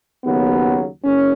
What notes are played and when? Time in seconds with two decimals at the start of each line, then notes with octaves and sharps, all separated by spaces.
0.22 D#2 C#3 F#3 B3
1.03 F#1 F#2 C#4